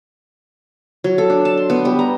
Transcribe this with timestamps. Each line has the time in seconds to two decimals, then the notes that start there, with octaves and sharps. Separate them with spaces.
1.04 F#3
1.18 A4
1.30 D4
1.45 A5
1.57 C6
1.70 B3
1.85 G3
1.99 A#5